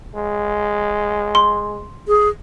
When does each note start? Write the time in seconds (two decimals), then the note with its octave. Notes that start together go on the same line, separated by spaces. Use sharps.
0.15 G#3
1.35 C6
2.08 G#4